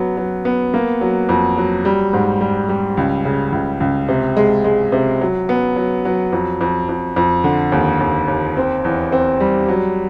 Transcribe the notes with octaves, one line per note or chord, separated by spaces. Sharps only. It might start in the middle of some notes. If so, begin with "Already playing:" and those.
Already playing: F#3 B3
F#3
B3
A#3
F#3
F2
F#3
G3
G#2
G3
G3
C#2
C#3
C#2
C#2
C3
G#3
G#3
C3
F#3
B3
F#3
F#3
F2
F2
F2
F2
D3
D#2
D#2
D#2
C4
E2
C4
G3
F#3